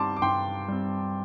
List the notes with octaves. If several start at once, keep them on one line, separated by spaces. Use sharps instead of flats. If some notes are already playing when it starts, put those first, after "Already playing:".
Already playing: G2 G3 C4 A5 C6 D6
D6
G2 G5 C6
G3 C4